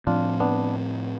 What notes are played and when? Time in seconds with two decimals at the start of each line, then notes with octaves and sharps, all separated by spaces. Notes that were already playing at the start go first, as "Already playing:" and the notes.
0.07 A2 F3 C4 D4 F4
0.40 B3 D4